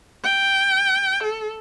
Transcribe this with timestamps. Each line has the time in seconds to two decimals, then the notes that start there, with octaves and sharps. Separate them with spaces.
0.24 G5
1.24 A4